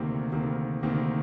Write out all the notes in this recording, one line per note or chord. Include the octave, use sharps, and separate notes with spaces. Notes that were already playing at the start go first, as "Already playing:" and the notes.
Already playing: D2 C3 D#3 A#3
D2 C3 D#3 A#3
D2 C3 D#3 A#3